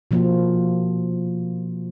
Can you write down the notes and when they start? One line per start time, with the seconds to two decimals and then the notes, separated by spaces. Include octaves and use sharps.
0.11 B2 F3 A#3 F4